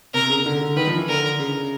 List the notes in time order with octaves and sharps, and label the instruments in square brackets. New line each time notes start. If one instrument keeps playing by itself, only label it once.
[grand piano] C3 [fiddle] A#4
[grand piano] C#3
D3
D3
[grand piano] D#3 [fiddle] B4
[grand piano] F3
E3
[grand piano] D3 [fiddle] A#4
[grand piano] C#3